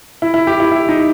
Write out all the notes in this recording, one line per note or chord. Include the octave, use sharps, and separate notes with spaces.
E4
E4
G4
E4
E4
D#4